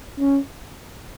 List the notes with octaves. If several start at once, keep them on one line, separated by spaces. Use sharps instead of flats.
C#4